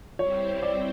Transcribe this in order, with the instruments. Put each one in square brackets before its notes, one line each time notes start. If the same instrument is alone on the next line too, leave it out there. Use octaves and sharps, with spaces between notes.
[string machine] G3 C4 E4 G4 C5 [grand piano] C#5
[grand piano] D5